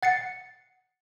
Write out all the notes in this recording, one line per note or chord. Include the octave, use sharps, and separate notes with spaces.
F#5 A6 C7 C#7